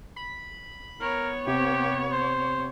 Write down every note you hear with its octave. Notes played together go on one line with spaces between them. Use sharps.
B5
B3 A#4 C#5
C3 G4
C5